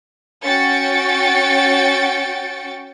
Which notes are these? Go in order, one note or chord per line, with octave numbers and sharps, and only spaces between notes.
C#4 F#4 G5 A6 C#7